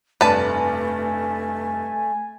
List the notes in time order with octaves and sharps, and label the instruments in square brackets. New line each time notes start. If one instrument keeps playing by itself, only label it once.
[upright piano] F1 G2 D5 [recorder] A3 [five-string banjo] B4 A5 [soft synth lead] G#5